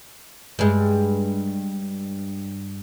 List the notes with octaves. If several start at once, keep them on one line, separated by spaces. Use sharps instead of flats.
G2 G#3